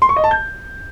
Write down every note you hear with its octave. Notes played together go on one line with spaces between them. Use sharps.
C6
C#6
D#5
A5
G6